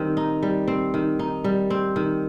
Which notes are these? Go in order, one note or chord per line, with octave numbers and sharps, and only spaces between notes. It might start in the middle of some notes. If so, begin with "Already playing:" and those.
Already playing: D#3 G3 C4
D#4
G3
C4
D#3
D#4
G3
C4
D#3